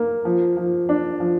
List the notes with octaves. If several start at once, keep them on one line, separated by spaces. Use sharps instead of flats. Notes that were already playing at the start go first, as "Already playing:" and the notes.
Already playing: A#3
F3
F3
D4
F3